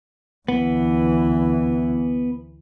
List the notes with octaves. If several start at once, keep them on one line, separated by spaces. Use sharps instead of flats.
D2 E3 B3